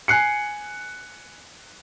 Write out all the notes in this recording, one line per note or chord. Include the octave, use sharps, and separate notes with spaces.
G#5 F#6 C7 C#7